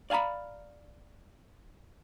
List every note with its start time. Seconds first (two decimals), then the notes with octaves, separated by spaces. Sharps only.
0.10 D5 F5 G#5 A#5 B5